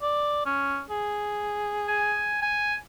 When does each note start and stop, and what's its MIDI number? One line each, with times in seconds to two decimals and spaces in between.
0.02 0.44 74
0.46 0.81 61
0.90 2.34 68
1.88 2.38 80
2.42 2.75 80